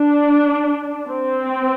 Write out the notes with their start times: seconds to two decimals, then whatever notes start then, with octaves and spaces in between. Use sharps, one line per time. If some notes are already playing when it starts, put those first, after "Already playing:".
Already playing: D4
1.08 C4